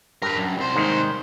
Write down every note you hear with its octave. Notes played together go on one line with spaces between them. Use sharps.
G2 A#4 B4
F#2
C2 C5
D#2 G#2 D#3